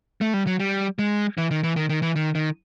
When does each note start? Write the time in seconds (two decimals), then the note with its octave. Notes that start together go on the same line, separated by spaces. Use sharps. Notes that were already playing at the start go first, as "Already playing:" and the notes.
0.21 A3
0.34 G3
0.47 F#3
0.60 G3
0.99 G#3
1.38 E3
1.51 D#3
1.64 E3
1.76 D#3
1.90 D#3
2.02 E3
2.16 D#3
2.35 D#3